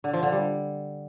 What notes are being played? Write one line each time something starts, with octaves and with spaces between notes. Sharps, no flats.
D3
F3
D3
G3